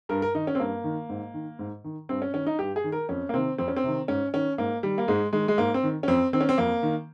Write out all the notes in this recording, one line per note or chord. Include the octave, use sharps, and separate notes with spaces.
G2 A#4
A#4
D#3 D#4
C#4
C4
G2 A#3
D#3
G#2
D#3
G#2
D#3
G2 C4
C#4
D#3 C#4
D#4
G2 G4
G#4
D#3
A#4
F2 C#4
A#3
C3 D#3 C4
F2 C4
C#4
C4
C3 D#3
G#2 C#4
D#3 C#4
G#2 A#3
D#3 G3
A#3
G#2 G#3
D#3 G#3
G#3
G#2 A#3
C4
D#3
C#4
F2 C4
D#3 C4
C#4
C4
F2 A#3
D#3